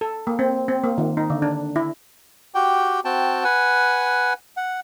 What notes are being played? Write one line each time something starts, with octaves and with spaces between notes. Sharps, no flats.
A4
A#3
C4
C4
A#3
D#3
D#4
D3
D4
E4
F#4 G4 G5
C4 F#4 G5 A5
B4 F#5 G#5
F#5